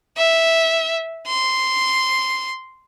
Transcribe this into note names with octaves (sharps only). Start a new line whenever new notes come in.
E5
C6